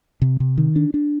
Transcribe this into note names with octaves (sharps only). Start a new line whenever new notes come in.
C3
C3
D#3
D4
D4